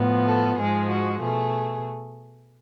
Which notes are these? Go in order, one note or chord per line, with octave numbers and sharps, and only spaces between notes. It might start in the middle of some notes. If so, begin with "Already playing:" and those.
Already playing: A2 F3 B3
A4
G#2 F3 G#3 G#4
F#4
B2 A3 G#4